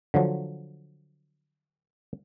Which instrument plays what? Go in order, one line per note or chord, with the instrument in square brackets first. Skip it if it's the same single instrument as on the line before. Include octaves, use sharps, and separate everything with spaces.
[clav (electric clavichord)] D3 F3 F#3